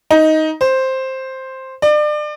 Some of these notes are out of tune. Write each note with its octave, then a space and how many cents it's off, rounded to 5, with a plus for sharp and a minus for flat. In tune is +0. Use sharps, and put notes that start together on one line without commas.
D#4 +10
C5 +5
D5 +35